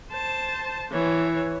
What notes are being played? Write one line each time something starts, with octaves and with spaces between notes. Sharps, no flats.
C5 A5
E3 C#5